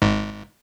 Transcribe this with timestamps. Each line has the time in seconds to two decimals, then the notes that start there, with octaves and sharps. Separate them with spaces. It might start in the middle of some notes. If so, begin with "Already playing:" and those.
0.02 G#1 G#2